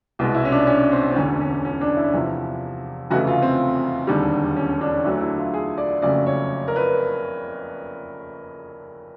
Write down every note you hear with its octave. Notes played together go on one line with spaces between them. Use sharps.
C2 B2 G#3
E4
C#4
D4
C#4
C4
C4
E1 D2 D3 C#4
C#4
C#4
D4
E4
E2 C3 F3
F1 E2 C#3 E3 A3 F#4
F4
C4
E1 D#2 D3 G3
C#4
D4
D2 D3 F#3 A3
E4
F4
G#4
D5
F#1 F2 C#3 F#3 A3 D5
C#5
A#4
B4